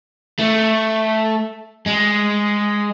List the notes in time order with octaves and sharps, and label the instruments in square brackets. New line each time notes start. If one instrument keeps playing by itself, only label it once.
[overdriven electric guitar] A3
G#3